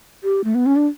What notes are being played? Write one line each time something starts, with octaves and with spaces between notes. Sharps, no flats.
G4
A3
B3
C#4
D4